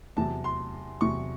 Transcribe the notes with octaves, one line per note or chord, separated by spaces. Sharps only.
E2 C3 F#3 A5
C6
E2 C3 F#3 C#6